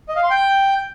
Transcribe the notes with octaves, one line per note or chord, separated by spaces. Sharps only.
D#5
F5
C6
G5